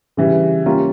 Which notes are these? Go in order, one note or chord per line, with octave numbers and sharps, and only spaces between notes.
C#3 E3 G3
G3 A#3 C#4 F4